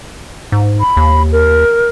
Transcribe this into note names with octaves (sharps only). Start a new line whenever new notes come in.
G#2
B5
D#2
A#4